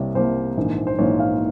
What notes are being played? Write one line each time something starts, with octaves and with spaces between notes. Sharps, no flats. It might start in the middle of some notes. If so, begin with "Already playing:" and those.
Already playing: C2 C3 G3 A#3 C#5
C2 C3 G3 A#3 C5
A#1 G#2 E3 A#3
C5
A#1 G#2 E3 A#3 C#5
F5